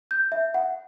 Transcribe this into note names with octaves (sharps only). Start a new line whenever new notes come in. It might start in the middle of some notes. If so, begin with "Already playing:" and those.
G6
E5
F#5